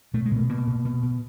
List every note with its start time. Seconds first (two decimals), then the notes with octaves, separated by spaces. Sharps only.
0.14 B2 A3
0.26 G#3
0.31 B2 A3
0.49 B2 A#3
0.67 B2
0.85 B2
1.03 B2